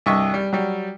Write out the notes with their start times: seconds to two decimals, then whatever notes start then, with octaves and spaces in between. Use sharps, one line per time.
0.06 C2 G2 D#5 E5 C#6
0.34 G3
0.53 F#3 G3